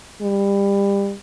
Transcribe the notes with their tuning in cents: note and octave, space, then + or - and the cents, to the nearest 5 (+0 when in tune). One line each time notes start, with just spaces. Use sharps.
G3 +25